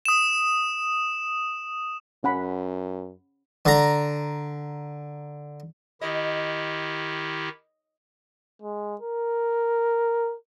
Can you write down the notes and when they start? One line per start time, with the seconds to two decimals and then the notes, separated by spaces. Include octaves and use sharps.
0.05 D#6 E7
2.24 F#2 C#4 F#5 B5
3.66 D3 A#5
6.01 D#3 E4 G4 D#5
8.62 G#3
9.01 A#4